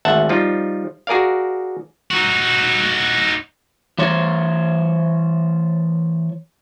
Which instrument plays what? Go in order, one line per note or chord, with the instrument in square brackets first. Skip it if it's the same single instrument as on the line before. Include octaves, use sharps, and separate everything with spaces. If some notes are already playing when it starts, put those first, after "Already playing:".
[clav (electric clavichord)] G#1 D2 E5 F#5 A5
F3 G3 D#4 F4
F#4 G#4 A#4 D5 F5
[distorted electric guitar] D#4 F#4
[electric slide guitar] E3 C5 C#5